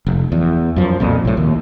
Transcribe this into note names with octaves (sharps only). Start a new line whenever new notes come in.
F1
E2
F#2 F3
B1 F2 A#2
B1 A2
D#2